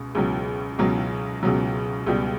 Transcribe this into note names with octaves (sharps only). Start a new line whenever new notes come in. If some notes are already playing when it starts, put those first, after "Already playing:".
Already playing: C#2 B2
C#2 B2 F#3
C#2 B2 F#3
C#2 B2 F#3
C#2 B2 G3